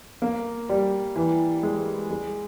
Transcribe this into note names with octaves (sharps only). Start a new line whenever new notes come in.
A#3
G3
E3
G#3
G#3